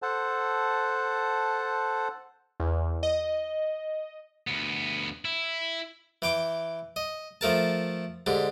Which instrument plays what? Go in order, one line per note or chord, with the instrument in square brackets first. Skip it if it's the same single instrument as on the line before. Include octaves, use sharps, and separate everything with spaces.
[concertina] A4 C5 F#5 A5
[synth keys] E2
D#5
[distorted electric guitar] D2 B3
E4
[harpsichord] E3 G5 D6
D#5
F3 A3 A#4 A5
G#2 D3 G4